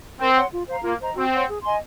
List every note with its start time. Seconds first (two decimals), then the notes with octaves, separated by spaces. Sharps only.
0.19 C4 A#4
0.35 C#5 F#5 C6
0.52 F4
0.67 C5 F5 A#5
0.83 A#3 F4
0.99 C5 D#5 A#5
1.15 C4 F#4
1.32 C#5 F#5 C6
1.47 G#4
1.63 D#5 G#5 C6